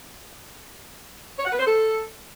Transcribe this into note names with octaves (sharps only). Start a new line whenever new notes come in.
C#5
F#5
B4
C5
A4